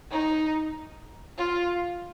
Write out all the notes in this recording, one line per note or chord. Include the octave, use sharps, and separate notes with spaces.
D#4
F4